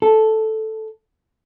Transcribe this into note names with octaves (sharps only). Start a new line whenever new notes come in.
A4